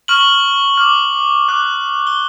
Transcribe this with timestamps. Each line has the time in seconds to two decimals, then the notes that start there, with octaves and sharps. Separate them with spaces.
0.08 C#6 F6 F#7
0.77 D6 F6
1.48 D6 F#6
2.07 G7